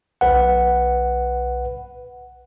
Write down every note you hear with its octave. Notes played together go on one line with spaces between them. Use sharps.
B1 B4 F#5